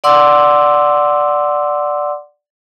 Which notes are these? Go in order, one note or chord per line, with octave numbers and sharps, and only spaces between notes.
D5 F#5 C6 D6 E6